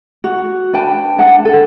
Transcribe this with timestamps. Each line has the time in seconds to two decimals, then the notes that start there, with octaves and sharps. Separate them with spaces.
0.24 F#4
0.73 D4 B4 G5 A5
1.18 D4 B4 F#5 A5
1.45 A4